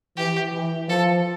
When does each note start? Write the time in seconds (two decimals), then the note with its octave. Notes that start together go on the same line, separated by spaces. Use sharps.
0.17 E3 G4
0.53 E3
0.89 F3 A4